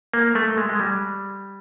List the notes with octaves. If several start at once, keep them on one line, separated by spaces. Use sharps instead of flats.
A#3
A3
G#3
G#3
G3